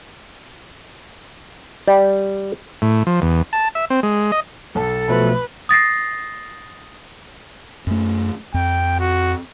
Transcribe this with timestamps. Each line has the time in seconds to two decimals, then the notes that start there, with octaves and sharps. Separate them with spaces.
1.88 G3
2.82 A2
3.07 F3
3.22 E2
3.53 A5
3.75 E5
3.90 C4
4.03 G#3
4.32 D#5
4.75 B1 A4 A5
5.09 B2 F3 A3 B4
5.69 D#6 A6 A#6 C7
7.87 F#2 A3
8.54 F2 G5
8.99 F#4